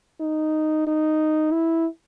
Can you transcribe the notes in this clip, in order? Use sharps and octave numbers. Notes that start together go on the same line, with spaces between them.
D#4
D#4
E4